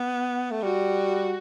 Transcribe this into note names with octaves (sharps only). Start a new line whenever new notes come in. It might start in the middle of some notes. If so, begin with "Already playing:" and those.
Already playing: B3
A3
G3 F#4